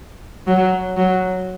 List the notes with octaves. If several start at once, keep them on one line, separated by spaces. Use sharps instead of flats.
F#3
F#3